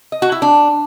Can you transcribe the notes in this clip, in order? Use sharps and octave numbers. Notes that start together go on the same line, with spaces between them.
D#5
F#4
E4
D4